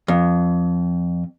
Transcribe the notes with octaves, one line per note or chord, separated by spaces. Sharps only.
F2